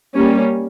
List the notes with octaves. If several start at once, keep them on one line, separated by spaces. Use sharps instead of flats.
G3 A#3 C#4